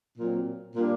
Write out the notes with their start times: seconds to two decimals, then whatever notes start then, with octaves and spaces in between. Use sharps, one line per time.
0.17 A#2 F#3 C4
0.75 A#2 G3 A#3 D4